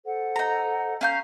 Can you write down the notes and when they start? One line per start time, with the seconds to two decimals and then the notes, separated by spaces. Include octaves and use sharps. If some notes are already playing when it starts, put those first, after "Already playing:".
0.05 A4 C5 F#5
0.36 D#4 A#5
1.01 C#4 F5 A#5 G6